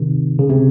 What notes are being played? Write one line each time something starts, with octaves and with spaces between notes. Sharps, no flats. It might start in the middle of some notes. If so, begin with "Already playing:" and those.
Already playing: C3 D#3
C#3
C3